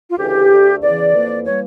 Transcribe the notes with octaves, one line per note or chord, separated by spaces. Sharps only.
F4
D2 C#3 E3 G4
D2 D3 A3
E2 C#3 E3 D5
F2 E3 A#3
E3 G3 A#3 C#5